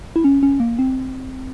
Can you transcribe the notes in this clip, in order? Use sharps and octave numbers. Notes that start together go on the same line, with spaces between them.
E4
C#4
C#4
A#3
C4